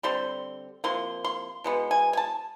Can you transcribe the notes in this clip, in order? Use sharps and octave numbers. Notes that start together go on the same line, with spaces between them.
D3 G3 C4 C6
C3 F3 A#3 C6
C6
B2 G#3 B3
G#5
G#5
A5